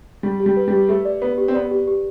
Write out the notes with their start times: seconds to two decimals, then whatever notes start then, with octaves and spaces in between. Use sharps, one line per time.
0.23 G3 G4
0.40 G4
0.46 G3
0.57 B4
0.68 G3
0.73 G4
0.89 A3 G4
1.05 D5
1.22 B3 B4
1.38 G4
1.48 C4
1.54 B3 D5
1.71 G4
1.87 G4